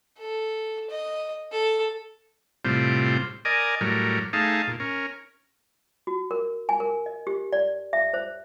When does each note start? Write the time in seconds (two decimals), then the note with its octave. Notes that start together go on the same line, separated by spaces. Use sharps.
0.19 A4
0.90 D#5
1.52 A4
2.65 A2 C3 G3 C4 F4
3.45 A#4 D5 D#5 G#5
3.81 A2 F#3 G3 A#4
4.33 A3 D#4 G#4 F5 A5
4.67 A#2
4.80 C#4 A#4
6.07 F#4
6.31 A#4
6.69 G#5
6.80 A#4
7.06 D#5
7.27 G4
7.53 D5
7.93 E5
8.14 C5